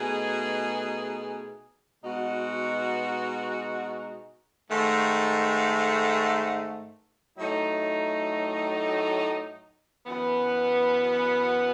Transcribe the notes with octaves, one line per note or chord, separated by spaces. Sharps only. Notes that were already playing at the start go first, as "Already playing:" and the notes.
Already playing: B2 A3 D#4 G#4
B2 G#3 D#4 F#4
G#2 D#3 A3
A2 F#3 A3 D#4
F#2 E3 B3